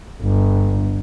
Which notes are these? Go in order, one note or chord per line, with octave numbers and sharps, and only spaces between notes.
G1